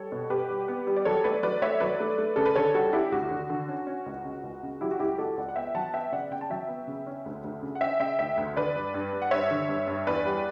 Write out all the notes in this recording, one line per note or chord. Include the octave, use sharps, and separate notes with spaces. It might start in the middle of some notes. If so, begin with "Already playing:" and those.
Already playing: G3 A4 C#5
B2
B2 G4 B4
G3
B3
G3
D5
F#3 A4 C#5
A3 B4 D5
F#3 B4 D5
A3 C#5 E5
F#3 B4 D5
A3
A3
C#3 A4
B4
D3 A4 C#5
G3 F#4 A4
C#4 E4 G4
D2 F#4
D3
D3
C#4
C#4
C#2
C#3
C#2
C#3
F#3 E4 G4
F#4
C#2 E4 G4
C#2 F#4 A4
C#2 D5 F#5
F#5
B3 E5 G5
F#3 F#5 A5
B3 E5 G5
C#3 D5 F#5
C#3 G5
A5
F#3 E5 G5
B3
C#3
C#4
D2
D2
C#3
F#5
C#4 E5 G5
C#3 E5 G5
D2 E5 G5
D2
D3 B4 D5
G2
G2
G2
F#5
G2 C#5 E5
D3
G2
G2
E2 B4 D5
G3